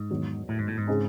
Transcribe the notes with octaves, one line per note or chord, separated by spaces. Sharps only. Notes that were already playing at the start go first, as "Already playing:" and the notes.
Already playing: G#2
E2 D#3 F#3
A2
G#2
A2
G#2
C#3 G#3 C4 D#4 G#4